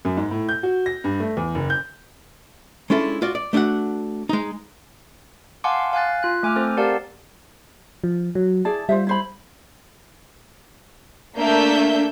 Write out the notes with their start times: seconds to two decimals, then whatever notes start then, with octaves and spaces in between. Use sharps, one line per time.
0.05 F#2
0.17 G#2
0.31 A2
0.49 G6
0.63 F#4
0.86 A#6
1.04 G2
1.20 A3
1.37 E2
1.55 F#1
1.70 G6
2.90 G#3 C#4 D4 E4 F4 A4
3.22 F4 F#4 D5
3.35 D5
3.53 A3 D4 E4 F#4 F#5
4.29 G#3 D#4
5.64 F5 F#5 G#5 A5 C6 D6
5.93 F5 G#5 F#6 A6
6.23 F4 F#6
6.43 A3 G#5 D6 F6
6.56 C4 A4 C5
6.77 G4 A#4 D5 F5 F#5 A5
8.04 F3
8.35 F#3
8.65 E4 G#4 D5 A5
8.89 G3 F4 C5 E5
9.07 E4 C5 B5
11.39 A3 A#3 D4 E5 G6